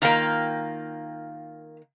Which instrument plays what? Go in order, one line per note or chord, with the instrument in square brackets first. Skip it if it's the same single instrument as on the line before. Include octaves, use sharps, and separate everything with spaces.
[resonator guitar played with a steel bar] D#3 A#3 [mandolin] F4 F5 G5